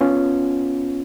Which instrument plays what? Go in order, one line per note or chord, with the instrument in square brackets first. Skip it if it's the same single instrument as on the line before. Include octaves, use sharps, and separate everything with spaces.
[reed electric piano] B3 C#4 F4